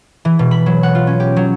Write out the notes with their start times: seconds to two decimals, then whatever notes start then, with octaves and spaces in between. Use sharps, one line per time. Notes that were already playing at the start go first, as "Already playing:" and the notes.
0.25 E3
0.39 B2
0.51 B5
0.66 F#3
0.83 F#5
0.95 F4
1.07 C#4
1.20 G4
1.36 F#3